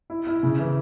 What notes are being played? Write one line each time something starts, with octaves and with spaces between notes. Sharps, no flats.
E4
E4
C#3
E3